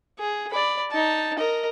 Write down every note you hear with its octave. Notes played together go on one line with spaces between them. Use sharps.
G#4
D5 B5
D#4 A5
A#4 D#5